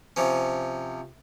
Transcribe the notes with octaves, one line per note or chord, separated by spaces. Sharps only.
C3 F3 C#4